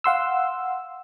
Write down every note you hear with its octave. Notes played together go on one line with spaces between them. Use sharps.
F5 F#5 C6 E6